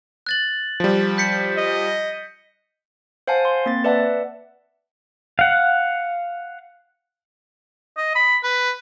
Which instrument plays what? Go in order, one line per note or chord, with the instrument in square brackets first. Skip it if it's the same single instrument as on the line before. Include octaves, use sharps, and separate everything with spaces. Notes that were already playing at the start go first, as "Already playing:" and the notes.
[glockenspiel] F#6 A6 F#7
[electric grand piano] F3 G3
[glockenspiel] G6 B6 C#7
[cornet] D#5
[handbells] C5 F5 F#5 G#5 A5
C6
A#3 C4 A6
B4 D5 E5 F#5 A5
[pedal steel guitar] F5 F#5
[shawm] D#5
B5
B4